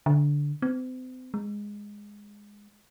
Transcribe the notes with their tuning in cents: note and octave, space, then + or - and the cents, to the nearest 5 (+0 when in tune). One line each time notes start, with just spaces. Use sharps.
D3 -10
C4 -40
G#3 -10